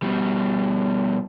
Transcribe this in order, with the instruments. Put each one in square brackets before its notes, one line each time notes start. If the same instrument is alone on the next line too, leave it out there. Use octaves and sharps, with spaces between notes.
[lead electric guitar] B2 G3